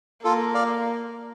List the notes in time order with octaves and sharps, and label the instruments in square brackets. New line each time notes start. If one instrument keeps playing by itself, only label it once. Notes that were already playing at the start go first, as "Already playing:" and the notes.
[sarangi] A#3 [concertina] F4 A4
[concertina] D5 F5